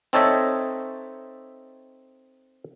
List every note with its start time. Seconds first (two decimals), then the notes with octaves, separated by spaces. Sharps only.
0.13 C4 D#4 A4 C#5 D#5 E5